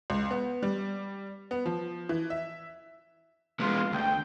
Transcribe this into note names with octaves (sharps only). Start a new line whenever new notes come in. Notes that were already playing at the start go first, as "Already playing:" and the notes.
C#2
B3
G3
B3
F3
E3
E5
G#3 B3 F4 C6
D2 G5